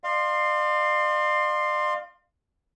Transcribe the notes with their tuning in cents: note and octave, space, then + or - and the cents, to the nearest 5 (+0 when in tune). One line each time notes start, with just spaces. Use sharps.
D5 +45 F5 +0 C6 +5